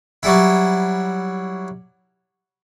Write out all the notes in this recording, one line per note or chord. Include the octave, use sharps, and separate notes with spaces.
F#3 G3 E4